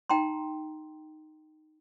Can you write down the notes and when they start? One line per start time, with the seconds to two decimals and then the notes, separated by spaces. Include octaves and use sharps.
0.10 D#4 G5 A#5 C6